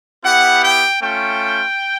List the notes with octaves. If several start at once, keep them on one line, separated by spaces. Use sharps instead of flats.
B3 E4 G4 F#5
G5
A3 C#4 F4 G5